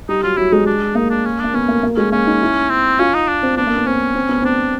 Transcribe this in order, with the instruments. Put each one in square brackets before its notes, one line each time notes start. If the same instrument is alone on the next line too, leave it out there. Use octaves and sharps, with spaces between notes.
[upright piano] G3 [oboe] D#4
[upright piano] F#3 [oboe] F4
[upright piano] F#3 [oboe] E4
[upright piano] G#3 [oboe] D#4
[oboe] D4
[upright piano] A#3 [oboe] D#4
[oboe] D4
C#4
[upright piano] A#3 [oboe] D4
[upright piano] B3 [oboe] C#4
[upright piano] A#3
A#3
[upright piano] G#3 [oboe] C#4
[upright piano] A#3 [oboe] C#4
[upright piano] D#4
E4
[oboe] C4
[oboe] C#4 [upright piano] F4
[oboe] D#4
D4
[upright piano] C4
[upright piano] B3 [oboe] D4
[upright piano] A#3
B3
[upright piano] C4 [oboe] C#4
[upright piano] C4
B3
[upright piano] C4 [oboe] D4